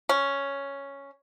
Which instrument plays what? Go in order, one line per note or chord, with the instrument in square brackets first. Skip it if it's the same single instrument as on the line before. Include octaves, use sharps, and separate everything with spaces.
[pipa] C#4